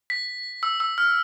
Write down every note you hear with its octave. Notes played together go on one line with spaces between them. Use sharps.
B6
E6
E6
F6